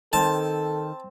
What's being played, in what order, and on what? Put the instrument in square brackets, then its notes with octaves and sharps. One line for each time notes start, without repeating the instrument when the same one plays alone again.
[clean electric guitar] D#3 [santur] C4 [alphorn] A4 [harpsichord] A5